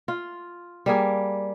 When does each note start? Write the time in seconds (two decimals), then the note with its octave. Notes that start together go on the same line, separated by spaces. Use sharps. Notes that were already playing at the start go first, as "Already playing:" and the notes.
0.08 F4
0.86 G3 A#3 G#4